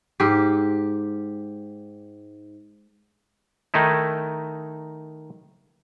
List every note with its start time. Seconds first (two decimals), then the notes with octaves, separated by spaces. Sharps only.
0.20 G#2 G4
3.74 D#3 A3 D#4 E4